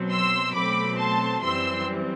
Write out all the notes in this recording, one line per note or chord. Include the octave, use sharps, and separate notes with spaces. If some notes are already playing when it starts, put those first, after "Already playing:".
Already playing: B2 F#3 C4
C6 E6
B2 F#3 A3 C4 B5 D6
A5 C6
F#2 E3 G3 C4 C6 E6